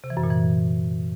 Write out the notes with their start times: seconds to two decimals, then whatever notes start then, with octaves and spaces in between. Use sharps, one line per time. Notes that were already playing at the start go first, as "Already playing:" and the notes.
0.04 C3
0.10 E3
0.17 F#2
0.23 A#2
0.30 E3